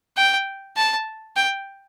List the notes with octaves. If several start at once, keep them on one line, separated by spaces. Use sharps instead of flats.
G5
A5
G5